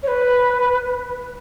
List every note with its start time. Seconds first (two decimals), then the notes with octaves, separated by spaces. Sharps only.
0.03 C#5
0.07 B4